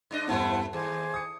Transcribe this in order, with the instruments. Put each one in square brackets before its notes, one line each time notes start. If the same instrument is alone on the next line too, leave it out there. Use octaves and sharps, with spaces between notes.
[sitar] G2 D4 D#5
[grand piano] E2 G2 [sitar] A3 C4 E4 [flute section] C5 F#5 A5
[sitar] D#2 [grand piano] G#4 [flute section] C5 G#5 D6
[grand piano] D#6 C#7